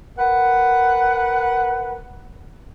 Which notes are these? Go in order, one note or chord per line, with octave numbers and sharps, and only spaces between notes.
A#4 B4 F#5